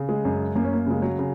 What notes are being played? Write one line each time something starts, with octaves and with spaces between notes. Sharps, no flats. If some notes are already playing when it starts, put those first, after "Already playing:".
Already playing: C#3
G#3
F#2
F#2 A#3
C#4
A#3
C#3 G#3
F#3
C#3